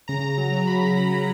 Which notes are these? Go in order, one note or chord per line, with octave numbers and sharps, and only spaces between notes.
C#3 A#5
C#3
F#3
F#3
F#3 B5
C#3
F#3
F#3